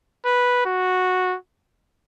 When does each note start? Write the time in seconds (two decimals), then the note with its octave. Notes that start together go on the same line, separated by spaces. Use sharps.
0.26 B4
0.66 F#4